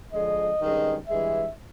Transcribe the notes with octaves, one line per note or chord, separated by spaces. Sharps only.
D3 F3 G#3 D#5
G2 D#3 G#3 C#4
G2 E3 G#3 E5